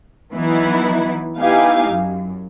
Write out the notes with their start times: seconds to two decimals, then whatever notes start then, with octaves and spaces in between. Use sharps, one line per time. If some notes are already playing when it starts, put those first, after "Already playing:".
0.33 E3 F#3 B3 D#4 E4
1.38 B3 D#4 E4 G4 F5 G#5
1.90 F#2